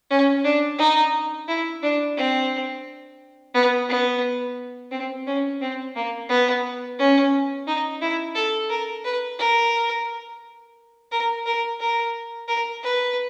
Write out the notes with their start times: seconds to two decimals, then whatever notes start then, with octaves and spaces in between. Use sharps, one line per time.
0.10 C#4
0.44 D4
0.79 D#4
1.48 E4
1.83 D4
2.17 C4
3.54 B3
3.89 B3
4.91 C4
5.27 C#4
5.61 C4
5.95 A#3
6.29 B3
6.99 C#4
7.68 D#4
8.02 E4
8.35 A4
8.70 A#4
9.05 B4
9.39 A#4
11.12 A#4
11.46 A#4
11.80 A#4
12.48 A#4
12.84 B4